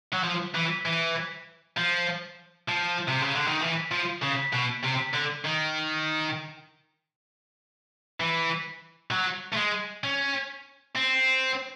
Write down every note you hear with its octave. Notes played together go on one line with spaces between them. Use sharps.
F#3
F3
E3
E3
F3
F3
C3
C#3
D3
D#3
E3
F3
C#3
B2
C3
D3
D#3
E3
F#3
A3
G#3
C#4
C4